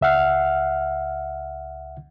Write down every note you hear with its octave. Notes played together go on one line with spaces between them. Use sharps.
C#2 E5 F#5 F6